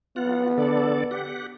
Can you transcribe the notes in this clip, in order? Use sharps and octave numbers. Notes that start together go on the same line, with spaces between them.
B3 F4 F#5
D3 A4 D5
G4 F#5